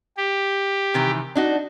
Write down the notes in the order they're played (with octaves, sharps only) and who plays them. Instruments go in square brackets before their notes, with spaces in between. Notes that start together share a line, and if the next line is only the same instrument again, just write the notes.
[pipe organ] G4
[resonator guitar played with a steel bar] C3 D#3 E3
D4 D#4 F#4